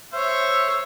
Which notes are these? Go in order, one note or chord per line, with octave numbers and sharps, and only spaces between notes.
C5 C#5 E5